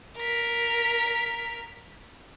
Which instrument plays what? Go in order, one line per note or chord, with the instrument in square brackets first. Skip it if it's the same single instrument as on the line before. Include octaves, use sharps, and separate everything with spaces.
[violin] A#4 B6